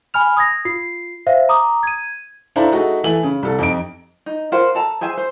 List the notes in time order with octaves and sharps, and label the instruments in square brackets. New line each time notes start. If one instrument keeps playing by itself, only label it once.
[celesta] G#5 B5 F6 F7
D#6 G#6 A#6
F4 C7
C5 E5 F5
A#5 D6 D#6
G#6 D#7
[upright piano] D4 E4 A4 C5 F5 A#5
A3 D#4 F#4 G#4
E3 A3 A4 G#5 F#7
C#3
C2 A4
F2 D#4 D7
[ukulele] D#4
F4 A#4 C5 F#5
A4 A5 A#5
G#4 C5 E5 G#5
C5